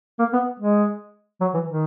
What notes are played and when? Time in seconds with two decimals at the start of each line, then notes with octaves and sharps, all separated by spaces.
0.19 A#3
0.33 B3
0.60 G#3
1.41 F#3
1.54 E3
1.67 D#3